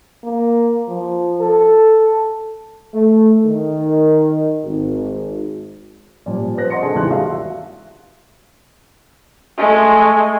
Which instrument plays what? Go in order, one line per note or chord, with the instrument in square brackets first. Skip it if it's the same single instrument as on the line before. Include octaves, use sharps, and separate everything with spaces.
[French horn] A#3
F3
A4
[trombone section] A3
D#3
G#1
[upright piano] A#2 F3 G3
B4 C5 F#6 A#6
D#5 F#5 C6 A#6 C#7
C3 D4 G#4 A4
D#1 G#1 E3 D5 C6 F#6
F#4 G4 E5 F5
[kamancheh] G#3 A3